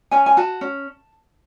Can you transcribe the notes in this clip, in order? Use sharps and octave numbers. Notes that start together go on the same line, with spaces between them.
C#4 G#5
G#5
F#4 A5
C#4